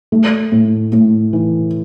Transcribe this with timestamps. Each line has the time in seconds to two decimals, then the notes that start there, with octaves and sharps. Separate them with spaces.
0.12 A3
0.52 A2
0.92 A2
1.33 E3